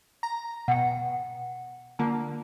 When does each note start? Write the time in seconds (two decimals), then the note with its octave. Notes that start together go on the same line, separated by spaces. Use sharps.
0.23 A#5
0.68 B2 F#5 G5
1.99 D3 A#3 D4 F4 A5